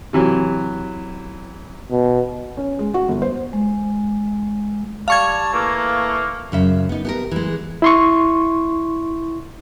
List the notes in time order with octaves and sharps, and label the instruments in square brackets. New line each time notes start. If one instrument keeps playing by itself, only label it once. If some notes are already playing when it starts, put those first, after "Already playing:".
[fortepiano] C3 E3 F#3
[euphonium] B2
[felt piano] C#4
G#3
F#4
G1
C5
[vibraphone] G#3
[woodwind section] G3 A5 [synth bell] F5 C#6 G#6
[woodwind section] E3 A3 A#3
[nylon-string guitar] F#2 C#3 E5
B3 D#4
B3 G4 A#4
E3 G#3
[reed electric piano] E4 C6 C#6